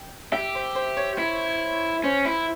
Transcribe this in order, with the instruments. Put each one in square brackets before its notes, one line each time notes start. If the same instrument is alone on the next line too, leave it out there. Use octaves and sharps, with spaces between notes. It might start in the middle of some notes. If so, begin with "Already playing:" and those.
Already playing: [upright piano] G5
[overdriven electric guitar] G4 [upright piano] E5
[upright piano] C5
C5
C#5
[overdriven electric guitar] E4
[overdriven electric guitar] C#4 [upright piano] C5
[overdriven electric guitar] E4